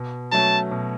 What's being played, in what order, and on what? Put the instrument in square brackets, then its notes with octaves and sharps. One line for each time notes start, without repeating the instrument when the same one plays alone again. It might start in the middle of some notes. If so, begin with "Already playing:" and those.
Already playing: [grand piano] B2
[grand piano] F#3 A3 C#4 [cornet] A5
[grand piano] B2